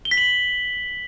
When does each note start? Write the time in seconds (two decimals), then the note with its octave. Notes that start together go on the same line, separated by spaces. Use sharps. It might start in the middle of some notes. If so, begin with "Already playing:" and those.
0.05 G7
0.11 B6
0.17 F#7